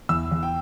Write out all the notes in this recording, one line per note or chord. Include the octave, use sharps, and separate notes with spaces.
E2 E6
E2
G5